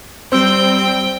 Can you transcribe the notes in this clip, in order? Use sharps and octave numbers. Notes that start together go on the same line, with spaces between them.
G3 C4 C5 G5 E6